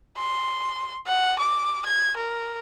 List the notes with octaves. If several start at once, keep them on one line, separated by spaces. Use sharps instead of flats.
C6
F#5
D6
G#6
A#4